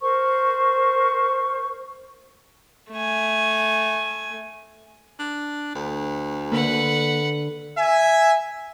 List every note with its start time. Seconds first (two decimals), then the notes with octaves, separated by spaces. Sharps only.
0.01 A#4 C5 C#6
2.93 A3 G#5
5.19 D4
5.75 D2
6.52 D3 A#3 B4 F#5
7.77 E5 G#5